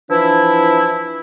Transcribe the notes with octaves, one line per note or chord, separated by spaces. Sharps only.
E3 F3 D4 E4